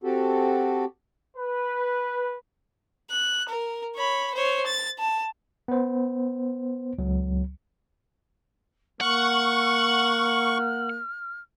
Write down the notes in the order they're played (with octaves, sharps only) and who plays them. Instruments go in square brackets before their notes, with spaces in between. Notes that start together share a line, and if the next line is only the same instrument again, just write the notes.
[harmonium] C4 F#4 G4 A4
[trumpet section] B4
[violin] F#6
A#4
C#5 B5
C5 C#5
A6
A5
[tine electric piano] B3 C5
C#2 F#3
[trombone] A#3 [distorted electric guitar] F#5 [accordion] C#6 [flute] F6